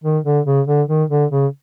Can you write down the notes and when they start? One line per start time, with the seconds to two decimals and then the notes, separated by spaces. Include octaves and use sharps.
0.04 D#3
0.25 D3
0.46 C#3
0.67 D3
0.89 D#3
1.10 D3
1.31 C#3